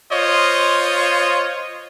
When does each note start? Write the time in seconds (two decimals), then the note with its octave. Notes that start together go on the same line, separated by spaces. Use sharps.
0.12 F4 C5 C#5 D#5